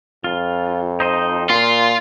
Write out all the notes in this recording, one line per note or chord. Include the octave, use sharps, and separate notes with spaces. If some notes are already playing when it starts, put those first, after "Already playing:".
F2 F4
D#4 C5 D#5
A#2 F4 C6